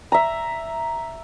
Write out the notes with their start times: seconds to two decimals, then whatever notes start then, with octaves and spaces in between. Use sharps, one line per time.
0.12 E5 A#5